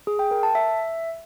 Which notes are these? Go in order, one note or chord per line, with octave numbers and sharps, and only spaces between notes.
G#4
G5
A#4
A5
E5